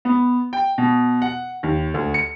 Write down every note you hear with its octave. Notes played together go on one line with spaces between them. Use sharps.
B3
G5
B2
F#5
D#2
D2
C#7